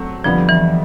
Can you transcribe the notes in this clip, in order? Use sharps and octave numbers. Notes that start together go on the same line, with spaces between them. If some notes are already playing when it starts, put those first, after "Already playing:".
Already playing: F#3 A3 C4
F2 D3 F3 G3 B3
E3